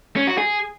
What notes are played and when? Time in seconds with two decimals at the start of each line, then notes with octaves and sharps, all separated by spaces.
0.16 C#4
0.27 F#4
0.38 G#4